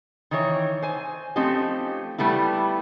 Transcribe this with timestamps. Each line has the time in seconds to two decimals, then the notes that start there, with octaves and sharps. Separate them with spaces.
0.31 D#3 E3 C#5
0.82 C5 G#5
1.36 F3 A3 C4 C#4 D#4 G4
2.18 G3 A3 B3 E4